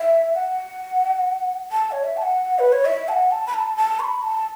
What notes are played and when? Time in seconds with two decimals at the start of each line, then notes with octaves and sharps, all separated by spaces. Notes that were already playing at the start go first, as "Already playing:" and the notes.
Already playing: E5
0.35 F#5
1.72 A5
1.91 C#5
2.04 E5
2.17 A5
2.22 F#5
2.59 B4
2.72 C#5
2.85 E5
3.08 A5
3.12 F#5
3.31 A5
3.47 B5
3.54 A5
3.77 A5
4.00 C#6
4.04 B5
4.22 A5